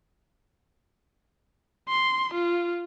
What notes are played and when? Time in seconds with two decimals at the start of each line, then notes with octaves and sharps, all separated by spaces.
1.89 C6
2.34 F4